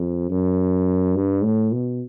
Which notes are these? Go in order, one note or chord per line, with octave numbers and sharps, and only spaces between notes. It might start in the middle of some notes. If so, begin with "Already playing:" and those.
Already playing: F2
F#2
G2
A2
B2